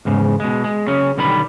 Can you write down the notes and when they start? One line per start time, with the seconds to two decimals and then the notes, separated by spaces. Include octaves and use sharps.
0.05 E2 G#2 C#3
0.40 B2 G#3
0.64 G#3
0.87 C#3 F#3 C#4
1.17 B1 D3 D#3 G3 B3 B5